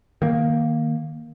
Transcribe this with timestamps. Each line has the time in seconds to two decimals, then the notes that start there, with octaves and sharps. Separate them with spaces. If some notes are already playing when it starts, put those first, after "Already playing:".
0.22 D#3 A#3